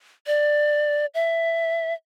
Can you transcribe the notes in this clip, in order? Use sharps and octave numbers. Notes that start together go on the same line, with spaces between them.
D5
E5